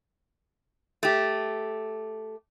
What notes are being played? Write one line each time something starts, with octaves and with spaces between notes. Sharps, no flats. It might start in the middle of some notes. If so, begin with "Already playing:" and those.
A3 G4